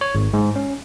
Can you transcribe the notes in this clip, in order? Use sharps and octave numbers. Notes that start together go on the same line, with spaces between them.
C#5
G#1
G#2
C#4